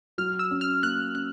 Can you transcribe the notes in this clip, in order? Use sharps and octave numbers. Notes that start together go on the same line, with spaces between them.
F#3 F6
E6
C#4
F6
A#3 F#6
C#4 F#6